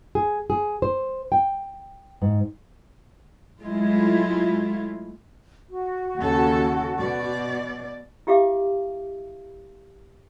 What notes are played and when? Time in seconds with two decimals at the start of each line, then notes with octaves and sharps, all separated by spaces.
0.15 G#4
0.50 G#4
0.82 C5
1.32 G5
2.22 G#2
3.60 F#3 G#3 A3 E4 F4
5.69 F#4
6.17 D#2 C#3 A4
6.97 B2 D5
8.27 E4 G4 E5 F5 D6